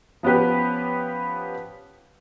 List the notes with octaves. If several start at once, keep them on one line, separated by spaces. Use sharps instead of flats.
F3 B3 C#4 G4 B4